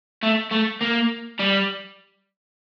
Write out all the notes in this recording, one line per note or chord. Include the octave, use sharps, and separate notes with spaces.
A3
A3
A#3
G3